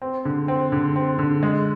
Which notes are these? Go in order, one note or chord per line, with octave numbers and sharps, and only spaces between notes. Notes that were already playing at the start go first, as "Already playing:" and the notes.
C4
D3
C4
D3
C4
D3
G#3